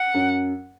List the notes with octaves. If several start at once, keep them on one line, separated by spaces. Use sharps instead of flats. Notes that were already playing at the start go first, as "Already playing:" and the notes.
Already playing: F#5
F#2